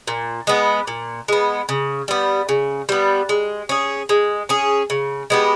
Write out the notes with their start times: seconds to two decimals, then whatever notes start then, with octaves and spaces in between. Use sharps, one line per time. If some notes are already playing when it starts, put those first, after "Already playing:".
0.07 A#2
0.47 G#3 B3
0.87 A#2
1.28 G#3 B3
1.69 C#3
2.08 G3 B3
2.49 C#3
2.89 G3 B3
3.29 G#3
3.69 C#4 G#4
4.09 G#3
4.49 C#4 G#4
4.90 C#3
5.30 G#3 B3 G4